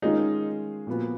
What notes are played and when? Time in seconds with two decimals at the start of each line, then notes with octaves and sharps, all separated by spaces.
0.02 D#3 G#3 C#4 D#4 F4 G#4
0.87 A#2 F3 B3 F#4